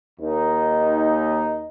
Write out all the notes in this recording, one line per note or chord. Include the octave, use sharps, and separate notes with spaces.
D#2 D#4